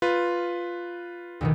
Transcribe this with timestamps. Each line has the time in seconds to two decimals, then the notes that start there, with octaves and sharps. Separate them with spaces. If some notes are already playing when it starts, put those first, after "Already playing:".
0.02 F4 B4
1.41 D2 B2 D#3